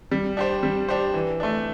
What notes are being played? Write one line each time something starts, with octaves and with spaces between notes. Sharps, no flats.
G3
D4 G4 C5
G3
D4 G4 C5
E3
A3 D4